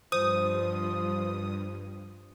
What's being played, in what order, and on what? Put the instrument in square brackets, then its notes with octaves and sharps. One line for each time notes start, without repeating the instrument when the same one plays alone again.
[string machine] G2 [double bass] F3 [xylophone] C5 D#7 [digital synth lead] D#6